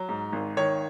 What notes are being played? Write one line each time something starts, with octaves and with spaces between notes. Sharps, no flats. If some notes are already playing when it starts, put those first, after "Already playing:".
Already playing: F#3
G#2
G#1
D#3 C#5